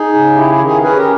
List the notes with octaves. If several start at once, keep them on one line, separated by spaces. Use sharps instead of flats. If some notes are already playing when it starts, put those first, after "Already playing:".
Already playing: D#4 G#4
C#3
E4 G4
G#4
D#3
G#4
C#4 G#4 B4
G4 A#4